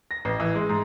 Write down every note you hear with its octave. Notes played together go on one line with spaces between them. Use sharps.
A#6
A1
E3
G#3
G#2